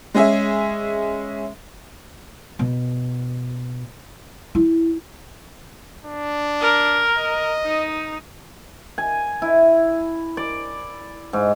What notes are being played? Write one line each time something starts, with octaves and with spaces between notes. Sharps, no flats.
G#3 C#4 G#4 E5
B2
E4
D4
A#4
D#5
D#4
G#5
E4
D5
G#2